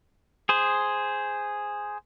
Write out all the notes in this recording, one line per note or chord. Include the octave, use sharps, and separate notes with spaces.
G#4 C5